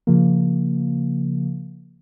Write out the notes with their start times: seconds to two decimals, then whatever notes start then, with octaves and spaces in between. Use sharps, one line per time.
0.07 C#3 F3 A#3